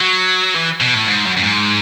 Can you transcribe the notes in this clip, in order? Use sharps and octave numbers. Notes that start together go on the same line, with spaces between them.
F#3
E3
B2
A2
G#2
F#2
F#2
G#2